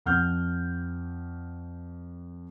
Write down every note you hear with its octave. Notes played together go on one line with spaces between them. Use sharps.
F2 F#5 F6 G6